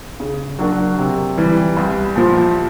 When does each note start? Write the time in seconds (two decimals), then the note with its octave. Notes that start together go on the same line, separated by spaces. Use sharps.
0.20 C#3
0.59 F#3 A#3 D4 F#4
0.98 C3
1.37 E3 G3
1.77 C2
2.16 A#2 F3